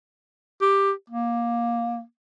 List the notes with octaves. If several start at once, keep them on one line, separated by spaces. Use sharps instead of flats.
G4
A#3